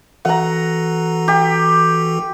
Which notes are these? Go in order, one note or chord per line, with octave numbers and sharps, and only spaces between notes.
E3 F#4 A4 F#5 A#5
G4